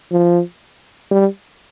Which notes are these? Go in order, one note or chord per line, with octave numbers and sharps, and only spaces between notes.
F3
G3